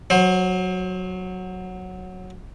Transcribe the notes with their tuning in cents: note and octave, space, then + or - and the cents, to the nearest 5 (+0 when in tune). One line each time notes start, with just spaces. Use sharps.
F#3 -5 C5 +25